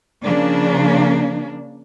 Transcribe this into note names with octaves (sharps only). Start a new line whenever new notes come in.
C#3 F3 A#3 D4